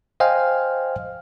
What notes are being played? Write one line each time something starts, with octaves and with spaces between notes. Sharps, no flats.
C5 D#5 F5 G5 G#5 F6